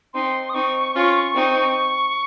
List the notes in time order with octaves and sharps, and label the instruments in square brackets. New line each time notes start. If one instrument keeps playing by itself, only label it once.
[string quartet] C4 D#4 [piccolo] C6
[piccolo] D#6
[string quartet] C4 D#4 [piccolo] C#6
[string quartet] C#4 F4
C4 D#4